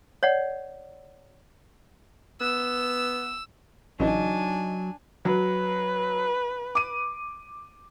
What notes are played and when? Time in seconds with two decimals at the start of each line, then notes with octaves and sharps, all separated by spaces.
0.23 C#5 D5 F#5
2.41 B3 E6
4.00 A1 C#3 E3 F#3 D4 D#4 G#5
5.25 F#3 B4
6.75 D6 D#7